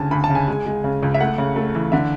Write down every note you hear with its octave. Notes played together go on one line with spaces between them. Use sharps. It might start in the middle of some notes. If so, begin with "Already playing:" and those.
Already playing: D2 C#3 G#5 A5
D2 B5
A5
C#3
G#5
G#3
G#3
C#3
C#2
E5
A3 F#5
C#3
A3
E3
D3 E5